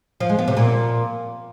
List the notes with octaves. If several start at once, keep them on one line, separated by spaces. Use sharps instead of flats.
F3
G#3
B3
C3
A#2